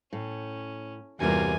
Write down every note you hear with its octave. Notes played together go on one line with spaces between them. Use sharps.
A2 C#4
E2 G2 C3 G3 A#3 F4 F#4 G#5